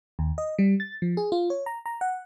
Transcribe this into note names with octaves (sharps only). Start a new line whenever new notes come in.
D#2
D#5
G3
A6
F3
G#4
F4
C#5
A#5
A#5
F#5